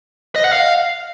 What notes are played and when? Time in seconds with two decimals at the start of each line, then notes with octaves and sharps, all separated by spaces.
0.36 D#5
0.44 F#5
0.52 F5